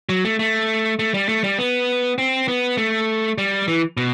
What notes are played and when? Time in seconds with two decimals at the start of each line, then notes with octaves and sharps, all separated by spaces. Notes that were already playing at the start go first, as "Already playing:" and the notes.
0.09 F#3
0.25 A3
0.39 A3
0.99 A3
1.14 G3
1.29 A3
1.44 G3
1.59 B3
2.18 C4
2.48 B3
2.77 A3
3.38 G3
3.68 E3
3.97 B2